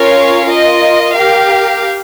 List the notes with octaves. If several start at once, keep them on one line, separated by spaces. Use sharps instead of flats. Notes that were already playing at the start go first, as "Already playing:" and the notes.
Already playing: C#4 F4 A#4 C#5 F5
F4 A#4 D#5
G4 A#4 F5